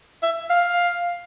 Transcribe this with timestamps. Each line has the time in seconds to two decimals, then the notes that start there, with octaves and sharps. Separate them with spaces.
0.23 E5
0.50 F5